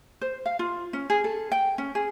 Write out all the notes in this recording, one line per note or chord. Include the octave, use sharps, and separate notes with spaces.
C5
F5
F4
C#4
G#4
A4
G5
C#4
G#4